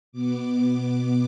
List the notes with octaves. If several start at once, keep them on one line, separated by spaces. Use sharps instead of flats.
B2 B3 D6
D6